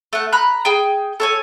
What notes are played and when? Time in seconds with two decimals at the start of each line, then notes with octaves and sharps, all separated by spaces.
0.13 A3 F#5
0.32 A#5 B5 F#6
0.65 G#4 G5
1.20 A4 C#5 G#5